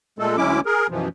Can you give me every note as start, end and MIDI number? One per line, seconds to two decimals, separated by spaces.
0.19 0.37 46
0.19 0.37 56
0.19 0.37 57
0.19 0.37 69
0.37 0.60 38
0.37 0.60 54
0.37 0.60 56
0.37 0.60 61
0.37 0.60 64
0.37 0.60 86
0.66 0.87 68
0.66 0.87 70
0.90 1.08 42
0.90 1.08 47
0.90 1.08 52
0.90 1.08 53